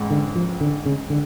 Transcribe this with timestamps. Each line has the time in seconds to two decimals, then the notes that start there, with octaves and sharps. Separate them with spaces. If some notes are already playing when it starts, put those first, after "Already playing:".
Already playing: A1 G#2 G#3
0.10 D3
0.35 F3
0.61 D3
0.86 C#3
1.10 D3